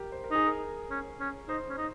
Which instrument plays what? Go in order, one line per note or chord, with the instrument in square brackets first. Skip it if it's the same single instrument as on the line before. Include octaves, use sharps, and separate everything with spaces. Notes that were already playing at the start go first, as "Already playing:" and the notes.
Already playing: [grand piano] G4 A#4
C5
A#4
[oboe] D#4 [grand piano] G#4
[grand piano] A#4
[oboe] C#4
C#4
[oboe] D#4 [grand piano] C5
[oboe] C#4
D#4